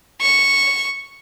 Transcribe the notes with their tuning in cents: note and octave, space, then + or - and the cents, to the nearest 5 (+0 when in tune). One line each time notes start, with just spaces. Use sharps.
C#6 -5